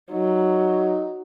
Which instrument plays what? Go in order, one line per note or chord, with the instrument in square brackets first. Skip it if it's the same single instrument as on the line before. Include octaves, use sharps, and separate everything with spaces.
[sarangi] F#3 [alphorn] D#4